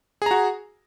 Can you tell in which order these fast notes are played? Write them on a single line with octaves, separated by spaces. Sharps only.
G#4 A#5 F#4